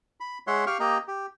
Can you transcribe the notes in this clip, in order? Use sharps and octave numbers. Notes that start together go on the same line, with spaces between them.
B5
G#3 C#5 E5 F#5 C6
G4 F5 G5 C#6 F6
A#3 G4 D#5 A#5
G4